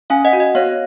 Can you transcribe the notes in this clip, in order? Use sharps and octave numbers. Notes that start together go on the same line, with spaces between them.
C#4 F5 G#5
D#5 F#5
F#4
D#5
B3 C#5 F5